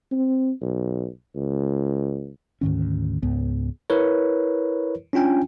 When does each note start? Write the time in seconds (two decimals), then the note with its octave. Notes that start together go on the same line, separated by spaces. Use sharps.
0.11 C4
0.62 B1
1.36 C#2
2.61 D2 G#2 D#3 C#4
3.22 C#2 G#2 B3
3.90 E4 A#4 B4 C#5
5.13 C#4 D4 F4 G5 G#5